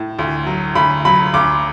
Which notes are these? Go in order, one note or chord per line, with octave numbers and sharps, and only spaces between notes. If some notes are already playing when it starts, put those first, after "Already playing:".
Already playing: A2
D2
F#3
D2 B5
F#3 B5
D2 D6